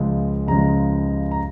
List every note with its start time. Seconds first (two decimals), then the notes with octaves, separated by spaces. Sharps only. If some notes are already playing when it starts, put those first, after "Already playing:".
Already playing: C#2 C#3 F3 G#3
0.47 C#2 C#3 F3 G#3 A#5
1.31 A#5